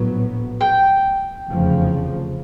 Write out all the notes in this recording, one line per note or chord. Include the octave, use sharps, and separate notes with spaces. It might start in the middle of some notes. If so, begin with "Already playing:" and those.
Already playing: A#1 A2 F#3 B3
G5
F1 E2 C#3 F3